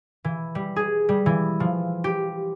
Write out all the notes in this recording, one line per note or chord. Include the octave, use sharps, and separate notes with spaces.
E3
G3
G#4
G3
E3
F3
G4